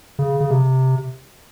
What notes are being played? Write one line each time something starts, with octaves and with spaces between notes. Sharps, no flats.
C#3
C#3
C3